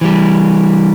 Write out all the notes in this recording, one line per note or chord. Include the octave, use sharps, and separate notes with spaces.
E3 G3